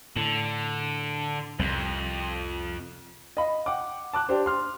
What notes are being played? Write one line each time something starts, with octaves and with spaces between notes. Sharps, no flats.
A2 D3
C2 F2
D#5 F5 B5
F#5 G5 D6
A5 D6 F#6
D4 G4 C5
C6 F6